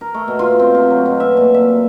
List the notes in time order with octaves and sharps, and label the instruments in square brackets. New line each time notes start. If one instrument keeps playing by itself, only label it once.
[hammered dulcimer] A#4
A3
B2
F4
C4
C3
F#3
B2
E5
A#2
E5